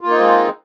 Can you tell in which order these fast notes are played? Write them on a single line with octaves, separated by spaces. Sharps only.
F4 A#3 D#4 C4 G#3